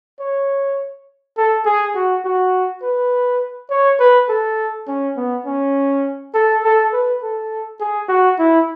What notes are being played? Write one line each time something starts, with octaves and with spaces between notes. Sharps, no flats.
C#5
A4
G#4
F#4
F#4
B4
C#5
B4
A4
C#4
B3
C#4
A4
A4
B4
A4
G#4
F#4
E4